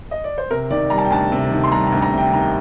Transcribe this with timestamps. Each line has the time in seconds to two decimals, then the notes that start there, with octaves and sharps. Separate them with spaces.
0.11 D#5
0.24 D5
0.38 C5
0.51 C3 A#4
0.70 D#3 D5
0.90 G3 A#5
0.98 A5
1.05 G5
1.10 D2 A5
1.32 C3
1.52 D#3
1.64 C6
1.72 G3 A#5
1.87 A#5
1.92 D2
2.02 A#5
2.13 C3 G5
2.33 D#3 A#5